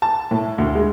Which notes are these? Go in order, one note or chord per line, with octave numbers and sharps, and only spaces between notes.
A5
A2
D2
G#3